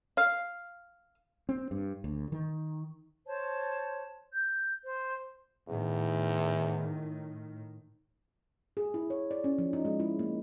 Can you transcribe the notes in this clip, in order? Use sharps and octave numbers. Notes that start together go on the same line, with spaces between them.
F5
C4
G2
D2
D#3
C5 C#5 A5
G6
C5
E2 A2 D#3
G#4
E4
C#5
D5
C#4
F3
D#4
G#3
E4
A#3